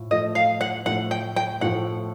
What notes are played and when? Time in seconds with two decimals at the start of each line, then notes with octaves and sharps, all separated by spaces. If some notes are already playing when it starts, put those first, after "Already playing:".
Already playing: A2 F3
0.11 A2 F3 A3 D#5
0.35 F5
0.61 F#5
0.86 A2 F3 A3 F#5
1.11 G5
1.36 G5
1.61 A2 F3 A3 F#5